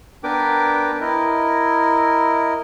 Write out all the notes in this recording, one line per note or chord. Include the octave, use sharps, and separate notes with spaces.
B3 D4 A#4 B4 G5 D6
E4 A#4 D#5